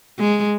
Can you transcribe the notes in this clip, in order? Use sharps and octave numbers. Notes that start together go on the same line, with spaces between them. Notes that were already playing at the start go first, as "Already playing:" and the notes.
G#3